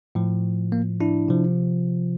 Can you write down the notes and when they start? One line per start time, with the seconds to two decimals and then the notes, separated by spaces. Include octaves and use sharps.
0.15 A2 F3
0.72 A#3
1.00 D4 E4
1.28 C3 F3